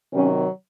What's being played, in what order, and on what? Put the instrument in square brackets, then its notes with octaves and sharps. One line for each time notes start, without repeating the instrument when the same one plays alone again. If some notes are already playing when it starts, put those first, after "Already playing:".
[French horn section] C3 D#3 F#3 C#4